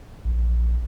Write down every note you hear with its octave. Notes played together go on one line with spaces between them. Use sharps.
A#1